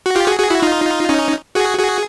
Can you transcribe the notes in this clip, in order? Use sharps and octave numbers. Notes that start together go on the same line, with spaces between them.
F#4
F4 G4
F#4 G#4
F#4 G#4
E4 F#4
D#4 F4
C#4 D#4
F#4 G#4
F#4 G#4